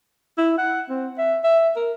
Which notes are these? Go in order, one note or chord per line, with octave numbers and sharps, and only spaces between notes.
E4
F#5
C4
E5
E5
A#4